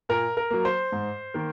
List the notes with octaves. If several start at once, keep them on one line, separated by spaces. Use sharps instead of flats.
A#2 A#4
A#4
F#3 A#3
C5
G#2
D#3 A#3